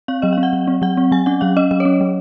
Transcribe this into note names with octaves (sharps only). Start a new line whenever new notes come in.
C4 F5
F#3 D#5
F5
C4
F#5
F#3
C4
F#3 F#5
C4
F#3 G#5
C#4 F#5
F#3 F5
C#4 D#5
F#3 D#5
C#5
C#4
F#3